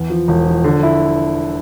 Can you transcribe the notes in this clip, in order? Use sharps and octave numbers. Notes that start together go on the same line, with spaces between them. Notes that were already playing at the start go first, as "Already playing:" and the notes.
Already playing: E2
F3
E1
F3
D3
E4